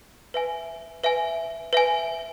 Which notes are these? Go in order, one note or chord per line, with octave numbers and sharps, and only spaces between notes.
B4 E5 G#5
B4 E5 G#5
B4 E5 G#5